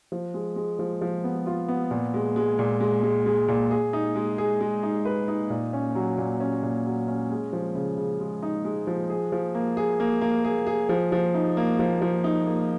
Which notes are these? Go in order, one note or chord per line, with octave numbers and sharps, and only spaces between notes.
F3
G#3
G#3
F3
F3
B3
F4
B3
A#2
G#3
G#3
A#2
G#3
G#3
G#3
A#2
G#4
D#4
G#3
G#4
G#3
D#4
B4
D#4
A#2
C#4
F#3
A#2
C#4
A#2
F#3
C#4
G#3
F3
C#3
C#3
G#3
D#4
G#3
F3
G#4
F3
A#3
G#4
A#3
A#3
G#4
G#4
F3
F3
D#4
A#3
F3
F3
D#4
A#3